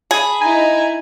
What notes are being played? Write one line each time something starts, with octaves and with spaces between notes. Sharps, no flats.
G#4 A5 B5
D#4 E4 G#5 A#5